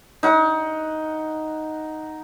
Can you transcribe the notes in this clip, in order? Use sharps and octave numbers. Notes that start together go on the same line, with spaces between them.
D#4 F#5